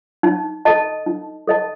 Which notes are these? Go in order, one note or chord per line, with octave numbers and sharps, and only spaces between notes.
D#4
A4 D#5 A5
D#4
A4 D#5 A5